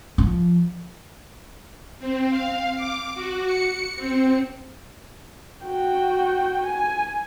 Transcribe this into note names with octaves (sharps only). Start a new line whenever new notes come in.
F3
C4
F5
D6
F#4
C#7
C4
F#4 G5
G#5